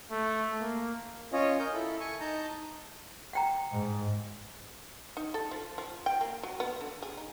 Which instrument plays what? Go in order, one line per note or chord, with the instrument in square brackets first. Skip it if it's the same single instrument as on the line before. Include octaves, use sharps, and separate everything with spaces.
[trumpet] A3
A#3
[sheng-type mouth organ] C#4 F4 C#5 D#5
A#4 D#5 G6
E4 A4
G#5 C#6
D#4 A5 A#5 G6
[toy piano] F#5 G5 A#5
[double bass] G#2
[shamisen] D#4
A4
F3
F3
G5
A#3
F#3
B3
D3
G#4
D#4